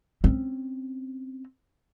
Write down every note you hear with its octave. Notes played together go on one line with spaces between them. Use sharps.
C4 C#4